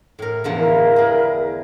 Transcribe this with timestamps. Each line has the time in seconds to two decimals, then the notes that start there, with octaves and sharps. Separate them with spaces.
0.19 A2 A#4
0.44 E2 D3 F3
0.57 E4 A#4 E5
0.96 B3 G#4